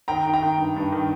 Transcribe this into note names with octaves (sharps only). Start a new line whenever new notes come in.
D#3 G5 A#5
D#3
G5 A#5
D#3
G2
G2
D#3